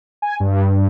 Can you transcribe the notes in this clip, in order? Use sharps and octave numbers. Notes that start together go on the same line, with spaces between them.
G#5
G2